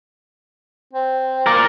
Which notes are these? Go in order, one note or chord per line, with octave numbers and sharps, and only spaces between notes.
C4
A#4 D5